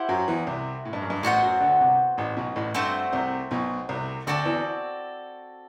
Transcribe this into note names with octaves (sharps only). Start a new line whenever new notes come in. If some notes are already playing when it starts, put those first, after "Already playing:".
Already playing: E4 G4 C5 F#5
F#2 F#3
E2 E3
C2 C3
A2
G2
F#2
G2
A1 A2 B3 F#4 C5 F#5
F#2 F#3
D2 D3
C2 C3
A1 A2
B1 B2
A1 A2
G2 A3 C4 F#4 C5
C2 C3
B1 B2
C2 C3
D2 D3 C4 F#4 A4 D5
E2 E3